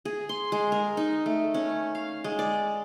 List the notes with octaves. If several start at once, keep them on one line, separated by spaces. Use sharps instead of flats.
G#4
C6
G#3
A#4
D#4
A3
C#4
F5
G#3
D5